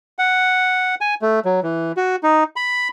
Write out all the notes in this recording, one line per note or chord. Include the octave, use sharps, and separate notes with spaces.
F#5
G#5
A3
F#3
E3
F#4
D#4
B5